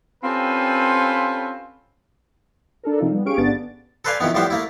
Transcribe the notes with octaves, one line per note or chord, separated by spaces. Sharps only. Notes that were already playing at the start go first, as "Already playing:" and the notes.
C4 C#4 F4 G4 A4 B4
D4 A4 A#4
C3 F3 C4 D#4 F4
G3 B3
C#4 G4 G#4 F5 C#6 D7
G#1 D3 B3 D4 A6
A4 B4 C5 D5 F5 G#5
F2 B2 D#3 E3 B3
A2 F3 G3 B3 C5
A3 A#3 E4